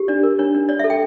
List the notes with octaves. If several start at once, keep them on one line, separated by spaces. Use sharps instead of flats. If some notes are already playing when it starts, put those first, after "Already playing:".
Already playing: G4
D4 D5
A#4
D4 C#5
D4
C#5 D5
A4 E5
G5